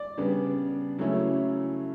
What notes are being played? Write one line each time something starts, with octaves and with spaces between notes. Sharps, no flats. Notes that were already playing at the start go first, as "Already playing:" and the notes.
Already playing: D5
C#3 G3 B3 D4
C#3 F#3 A3 C#4 E4